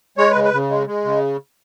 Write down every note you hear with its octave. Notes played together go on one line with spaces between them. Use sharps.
G#3 C#5
B4
C#3
B4
C#3
G#3
G#3
C#3